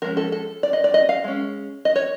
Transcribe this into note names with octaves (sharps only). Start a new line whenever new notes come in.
F3 G#3 C#4 A#4
A4
A4
D5
D#5
D5
D#5
F5
G#3 C#4
D#5
C#5